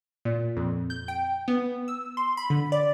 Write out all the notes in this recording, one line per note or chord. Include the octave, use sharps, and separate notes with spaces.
A#2
F2
G6
G5
B3
E6
C6
B5
D3
D5